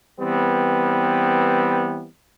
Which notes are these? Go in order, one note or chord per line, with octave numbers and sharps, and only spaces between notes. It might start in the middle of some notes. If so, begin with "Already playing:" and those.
E3 G3 B3 C4